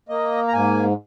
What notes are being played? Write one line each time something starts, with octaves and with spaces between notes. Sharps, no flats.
A#3 D#5
A#5
G#2 G#5